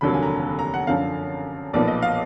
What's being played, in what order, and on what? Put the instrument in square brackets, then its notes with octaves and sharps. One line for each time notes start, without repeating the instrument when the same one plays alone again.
[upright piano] F1 D#2 D3 F#3 A#3 B5
G#5
A#5
A#5
F#5
F#2 D3 F3 F5
B1 A#2 F3 B3 D5
D#5
F5